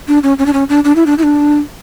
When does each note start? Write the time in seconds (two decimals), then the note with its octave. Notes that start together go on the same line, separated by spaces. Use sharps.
0.08 D4
0.23 C#4
0.38 C#4
0.46 D4
0.53 C#4
0.69 D4
0.84 D4
0.96 E4
1.06 D4
1.18 E4
1.23 D4